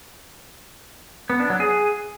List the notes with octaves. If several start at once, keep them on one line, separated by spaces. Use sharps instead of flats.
B3
D4
F#3
G#4